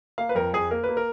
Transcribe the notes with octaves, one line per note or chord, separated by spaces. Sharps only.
A#3 F5
B4
F2 A#4
F2 G#4
A#3 A#4
B4
A#3
A#4